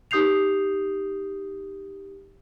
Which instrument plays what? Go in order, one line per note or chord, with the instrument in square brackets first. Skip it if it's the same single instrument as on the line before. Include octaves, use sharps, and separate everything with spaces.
[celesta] D#4 G4 D#6 G6 C7 F7